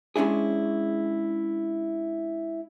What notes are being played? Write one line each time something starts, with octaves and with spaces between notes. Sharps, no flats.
G#3 C#4 D4 E4 G#4